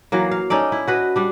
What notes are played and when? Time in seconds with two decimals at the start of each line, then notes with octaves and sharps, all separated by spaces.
0.12 E3 F#3 A#3
0.31 F5
0.50 C#4 D#4 A4 D5
0.72 E4
0.87 F#4 B4 D#5
1.16 G3 D4